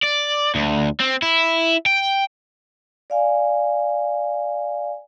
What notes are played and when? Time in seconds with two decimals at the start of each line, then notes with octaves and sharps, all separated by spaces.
0.03 D5
0.55 D2
1.00 C4
1.22 E4
1.86 G5
3.10 D5 F5 G#5